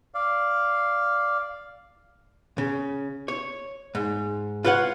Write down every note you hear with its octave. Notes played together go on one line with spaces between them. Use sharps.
D5 F5
C#3
C#5
G#2
F4 B4 C#5 F5 F#5